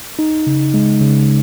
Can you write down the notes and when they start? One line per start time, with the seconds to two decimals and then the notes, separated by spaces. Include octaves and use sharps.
0.19 D#4
0.47 C#3
0.74 G#3
1.01 C#3